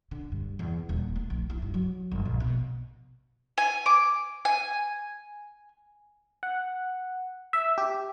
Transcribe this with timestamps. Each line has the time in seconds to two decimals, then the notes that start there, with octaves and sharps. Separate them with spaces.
0.11 D3
0.32 G2
0.59 E2
0.89 D#1
1.16 A3
1.30 A#1
1.50 E4
1.62 G2
1.74 F#3
2.12 G1
2.25 A#1
2.40 B2
3.58 G#5
3.86 D6
4.45 G#5
6.43 F#5
7.53 E5
7.78 G4